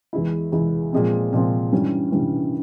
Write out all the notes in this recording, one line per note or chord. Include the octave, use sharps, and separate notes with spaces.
E2 E3 G#3 E4
E2 E3 G#3 E4
A#2 F3 G#3 C4
A#2 F3 G#3 C4
G2 E3 G3 C#4
G2 E3 G3 C#4